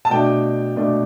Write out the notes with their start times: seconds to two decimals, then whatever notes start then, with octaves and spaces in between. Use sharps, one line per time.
0.05 A5
0.10 B2 A3 D4 G5
0.76 B2 A3 D4